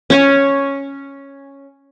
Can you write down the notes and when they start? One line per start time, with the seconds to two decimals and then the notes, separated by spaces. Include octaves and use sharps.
0.10 C#4 C#5 G#5